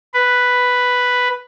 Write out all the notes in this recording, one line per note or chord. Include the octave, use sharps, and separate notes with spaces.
B4